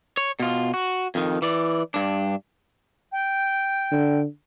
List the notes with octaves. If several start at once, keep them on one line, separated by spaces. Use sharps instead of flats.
C#5
B2 F4
F#4
F2 D#3
E3 D5
G2 D4
G5
D3